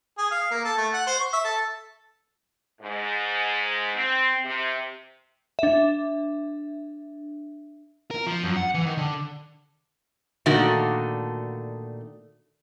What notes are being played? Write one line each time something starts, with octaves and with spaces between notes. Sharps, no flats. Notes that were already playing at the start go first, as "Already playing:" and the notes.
G#4
F5
A#3
A4
A3
F#5
C5
C#6
E5
A4
G#2
C4
C3
D4 E5
A#4
F3
F#2
F#5
E3
D#3
D3
A#2 D3 D#3 A3 F#4